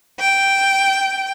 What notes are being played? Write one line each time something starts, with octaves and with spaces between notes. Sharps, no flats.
G5